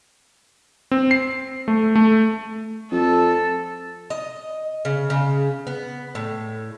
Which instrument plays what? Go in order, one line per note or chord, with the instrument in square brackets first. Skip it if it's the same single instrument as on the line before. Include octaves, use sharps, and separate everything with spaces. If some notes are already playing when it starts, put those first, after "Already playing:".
[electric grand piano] C4
C7
A3
A3
[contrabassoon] F2 [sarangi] A4
[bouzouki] D#5
C#3
C#3
B3
A2